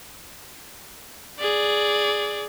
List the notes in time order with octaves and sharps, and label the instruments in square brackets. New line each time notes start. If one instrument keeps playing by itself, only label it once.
[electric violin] G#4 D5